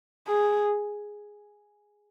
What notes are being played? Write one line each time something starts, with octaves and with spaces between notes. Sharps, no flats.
G#4